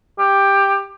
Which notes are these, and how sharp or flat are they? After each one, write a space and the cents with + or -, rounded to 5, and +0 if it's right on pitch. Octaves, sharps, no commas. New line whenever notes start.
G4 +10